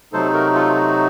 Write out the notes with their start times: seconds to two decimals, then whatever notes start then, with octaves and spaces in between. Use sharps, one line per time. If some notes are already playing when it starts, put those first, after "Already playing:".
0.13 C3 F#3 A3 D#4 A4 C5
0.33 F#4 A#4
0.54 F4 A4
0.75 F#4